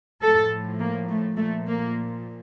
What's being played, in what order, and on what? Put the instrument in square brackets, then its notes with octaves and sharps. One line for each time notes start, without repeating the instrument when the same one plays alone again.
[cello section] A2 F3 A4
A#3
A3
A#2 F3 A3
A#3